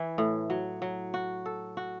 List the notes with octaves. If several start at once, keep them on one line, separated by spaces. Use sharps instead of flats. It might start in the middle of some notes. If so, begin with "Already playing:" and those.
Already playing: E3 E4
A2
F#3
F#3
F#4
A4
F#4